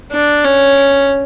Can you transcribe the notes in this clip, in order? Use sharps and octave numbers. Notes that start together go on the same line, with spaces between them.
D4
C#4